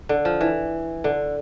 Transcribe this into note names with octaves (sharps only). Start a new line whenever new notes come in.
D3
F3
E3
D3